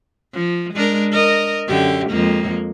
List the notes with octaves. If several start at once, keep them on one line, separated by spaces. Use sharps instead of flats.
F3
G#3 D4 A#4
A#4 D#5
F#2 D3 G4
F2 G#3 A#3